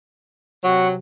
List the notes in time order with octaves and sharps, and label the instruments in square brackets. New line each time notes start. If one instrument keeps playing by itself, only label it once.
[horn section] C3 F#3 [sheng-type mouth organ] F#5 C#6